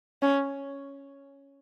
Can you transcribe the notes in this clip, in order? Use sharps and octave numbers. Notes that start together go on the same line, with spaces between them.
C#4